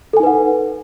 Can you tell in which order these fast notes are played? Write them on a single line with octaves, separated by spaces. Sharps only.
A4 G#5 D#4 B4 F#5